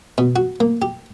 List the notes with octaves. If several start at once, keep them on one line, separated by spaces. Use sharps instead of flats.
B2
F#4
A#3
G4